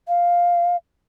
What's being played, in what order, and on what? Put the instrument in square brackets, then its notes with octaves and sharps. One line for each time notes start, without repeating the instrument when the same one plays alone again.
[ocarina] F5